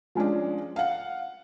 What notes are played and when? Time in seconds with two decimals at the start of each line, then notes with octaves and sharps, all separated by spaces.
0.15 F3 G#3 C#4 D4
0.76 F5 F#5